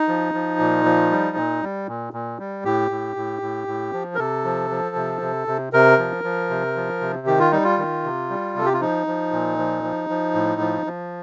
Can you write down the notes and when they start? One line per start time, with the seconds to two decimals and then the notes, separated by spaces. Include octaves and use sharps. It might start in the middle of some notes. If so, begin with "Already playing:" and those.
Already playing: D#4
0.08 F3
0.34 F3
0.60 A#2
0.85 F3
1.11 G3
1.37 A#2
1.62 G3
1.88 A#2
2.13 A#2
2.39 G3
2.65 A2 G4
2.91 A2
3.16 A2
3.42 A2
3.68 A2
3.93 F3
4.15 A#4
4.18 C3 A4
4.45 F3
4.70 F3
4.96 C3
5.22 C3
5.48 C3
5.73 C3 A#4
5.99 F3
6.24 F3
6.50 C3
6.76 F3
7.01 C3
7.27 D#3 G4
7.39 F4
7.52 G3 D#4
7.64 F4
7.78 D#3
8.04 C3
8.30 G3
8.55 C3 A4
8.66 G4
8.74 F4
8.81 F3 D#4
9.07 F3
9.32 A#2
9.58 F3
9.83 F3
10.10 F3
10.35 A2
10.61 F3
10.86 F3